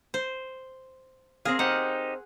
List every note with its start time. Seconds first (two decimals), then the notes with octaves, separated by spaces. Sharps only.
0.14 C5
1.45 C4 G#4 A#4 F5 D#6
1.59 D#4 G4 C5 F#5